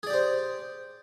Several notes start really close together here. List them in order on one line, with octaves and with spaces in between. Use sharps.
G#4 D5 G4 C5